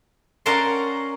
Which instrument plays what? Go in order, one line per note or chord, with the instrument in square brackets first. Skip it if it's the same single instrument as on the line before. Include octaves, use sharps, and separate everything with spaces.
[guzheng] C#4 A#4 D5 F#5 A5 C6